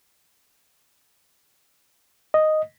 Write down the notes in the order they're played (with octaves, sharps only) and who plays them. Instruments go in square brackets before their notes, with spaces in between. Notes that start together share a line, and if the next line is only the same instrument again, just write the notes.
[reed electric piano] D#5